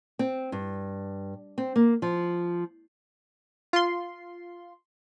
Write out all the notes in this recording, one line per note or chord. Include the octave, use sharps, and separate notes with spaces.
C4
G2
C4
A#3
F3
F4 C6